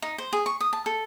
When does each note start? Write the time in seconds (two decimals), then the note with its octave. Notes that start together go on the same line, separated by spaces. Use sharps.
0.02 D#4
0.18 C5
0.33 G#4
0.46 C#6
0.61 D#6
0.73 A5
0.86 A4